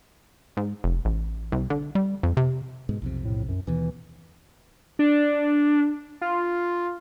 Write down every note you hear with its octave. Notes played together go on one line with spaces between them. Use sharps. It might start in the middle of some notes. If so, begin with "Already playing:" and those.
G#2
F1
A1
C2
D3
G3
F2
C3
G#2 B2 G#3
B1 F2 C3
A2
F#2
D#2 B2 E3
D4
F4